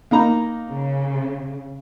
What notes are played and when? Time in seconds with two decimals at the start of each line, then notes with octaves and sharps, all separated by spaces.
0.11 A#3 D#4 A#5
0.69 C#3